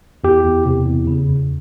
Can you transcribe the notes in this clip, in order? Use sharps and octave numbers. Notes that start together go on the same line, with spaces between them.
E2 G4
E2
C3
E2
C#3
E2